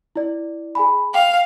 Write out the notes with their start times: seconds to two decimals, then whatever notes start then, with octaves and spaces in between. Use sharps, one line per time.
0.16 E4 D5
0.75 G#4 G#5 B5
1.14 F5 G5